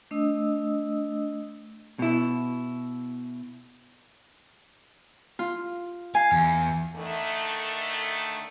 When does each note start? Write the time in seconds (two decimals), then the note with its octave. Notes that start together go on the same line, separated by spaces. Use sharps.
0.11 A3 D4 D#5 D#6 E6
1.99 B2 E4
5.39 F4
6.15 F5 G#5
6.32 E2
6.95 D3 D#3 A3